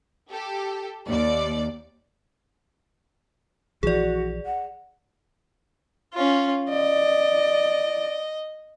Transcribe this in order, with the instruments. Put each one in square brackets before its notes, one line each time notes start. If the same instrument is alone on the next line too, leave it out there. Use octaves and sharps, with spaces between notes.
[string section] G4 A4
D#2 D5
[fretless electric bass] A#1 E3 F3 [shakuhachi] F#4 [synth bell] G#4 D5
[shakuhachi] F#5
[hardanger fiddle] C#4 F4
[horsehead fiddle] D5 [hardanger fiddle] D#5